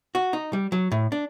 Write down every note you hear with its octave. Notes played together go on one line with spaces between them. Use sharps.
F#4
D#4
G3
F#3
A2
D4